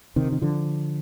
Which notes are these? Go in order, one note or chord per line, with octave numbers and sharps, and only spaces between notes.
C3 D#3
D#3
D3 F3